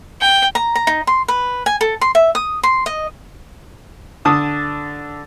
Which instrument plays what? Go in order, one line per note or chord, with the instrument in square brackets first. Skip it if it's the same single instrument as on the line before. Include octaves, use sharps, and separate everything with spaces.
[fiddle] G5
[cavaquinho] A#5
A#5
D#4
C6
B4
G#5
A4
C6
E5
D#6
C6
D#5
[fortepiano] D3 A5 D#6